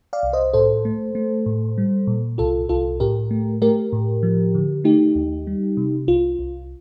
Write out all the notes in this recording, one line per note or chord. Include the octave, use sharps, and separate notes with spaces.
D5 F5
C2
C5 D#5
A2 A4 C5
A3
A3
A2
G3
A#2
C2 F4 A4
C2 F4 A4
A2 G4 A#4
A3
A3 G4 A#4
A2
F3
D3
A3 D#4 G4
D#2
G3
C3
C2 F4
C2